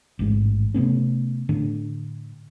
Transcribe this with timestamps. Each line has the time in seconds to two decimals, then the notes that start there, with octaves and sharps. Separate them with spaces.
0.19 A1 G#2 G#3
0.74 C3 A3 B3 C#4
1.49 A2 D3